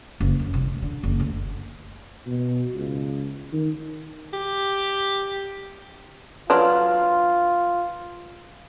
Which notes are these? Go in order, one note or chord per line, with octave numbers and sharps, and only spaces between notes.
F#1
F#2
C2
D2
D3
F#1
D2
B2
C#2
D#3
G4
F#3 D4 F4 B4 C6